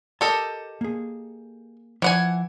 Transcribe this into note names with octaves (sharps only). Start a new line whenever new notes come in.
G4 A4 A#4 D#5 A5
A#3 G#4
E3 F3 F#5 G#5